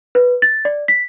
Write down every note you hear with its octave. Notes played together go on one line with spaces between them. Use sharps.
B4
A6
D5
B6